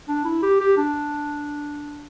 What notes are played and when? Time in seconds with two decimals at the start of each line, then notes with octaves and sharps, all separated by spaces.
0.08 D4
0.25 E4
0.43 G4
0.61 G4
0.77 D4